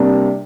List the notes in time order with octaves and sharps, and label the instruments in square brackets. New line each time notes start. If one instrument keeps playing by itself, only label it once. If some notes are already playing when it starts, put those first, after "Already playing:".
Already playing: [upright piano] C3 G3 A#3 D4